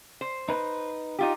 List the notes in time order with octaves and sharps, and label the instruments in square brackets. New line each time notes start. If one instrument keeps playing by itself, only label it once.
[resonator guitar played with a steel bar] C5
[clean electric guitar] D#4 B4
[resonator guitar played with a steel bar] D#4 F4 G4